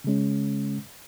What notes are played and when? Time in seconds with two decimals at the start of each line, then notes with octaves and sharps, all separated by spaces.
0.04 C#3 G#3 C#4